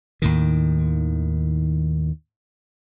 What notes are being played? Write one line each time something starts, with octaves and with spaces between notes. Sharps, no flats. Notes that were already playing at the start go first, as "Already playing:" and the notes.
D#2 A2 D#3